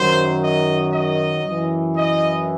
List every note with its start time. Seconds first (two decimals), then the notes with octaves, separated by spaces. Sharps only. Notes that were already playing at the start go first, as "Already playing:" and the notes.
Already playing: F#2 D#3 F#3 C5
0.42 D#5
0.92 D#5
1.44 F#2 E3
1.96 D#5